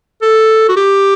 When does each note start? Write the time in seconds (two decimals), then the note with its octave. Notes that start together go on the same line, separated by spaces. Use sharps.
0.22 A4
0.69 F#4
0.76 G4